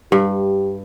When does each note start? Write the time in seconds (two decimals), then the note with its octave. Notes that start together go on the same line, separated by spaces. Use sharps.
0.12 G2 G4